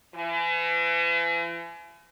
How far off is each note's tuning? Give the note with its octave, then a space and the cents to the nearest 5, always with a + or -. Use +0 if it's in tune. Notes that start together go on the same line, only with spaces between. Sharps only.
E3 +40